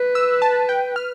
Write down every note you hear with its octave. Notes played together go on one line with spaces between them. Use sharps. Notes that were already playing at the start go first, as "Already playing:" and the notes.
Already playing: B4
E6
A5
G5
F6